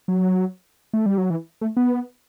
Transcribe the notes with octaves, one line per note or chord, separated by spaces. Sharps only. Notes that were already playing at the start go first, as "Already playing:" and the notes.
F#3
A3
G3
F#3
E3
A3
B3